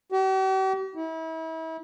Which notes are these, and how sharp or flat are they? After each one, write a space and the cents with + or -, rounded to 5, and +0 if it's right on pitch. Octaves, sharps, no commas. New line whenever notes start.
G4 -45
E4 -35